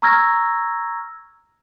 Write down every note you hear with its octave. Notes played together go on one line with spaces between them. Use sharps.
A#5 C#6 E6 F6 G#6 A#6